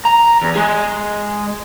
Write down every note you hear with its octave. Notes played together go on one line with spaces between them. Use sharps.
A#5
E2
G#3 G#4